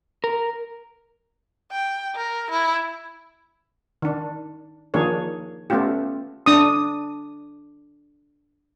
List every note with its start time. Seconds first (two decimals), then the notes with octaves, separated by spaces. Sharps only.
0.24 A#4
1.72 G5
2.15 A#4
2.51 E4
4.02 D#3 D4
4.94 D#3 F3 A#3 D4 G#4 C#5
5.70 A3 B3 C#4 F4 G4
6.46 D4 D#6